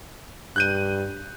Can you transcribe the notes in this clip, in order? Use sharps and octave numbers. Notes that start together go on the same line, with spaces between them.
G2 F#6 G6 D#7